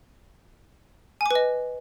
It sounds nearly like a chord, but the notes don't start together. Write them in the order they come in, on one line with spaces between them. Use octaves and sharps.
G#5 D6 B4 D#5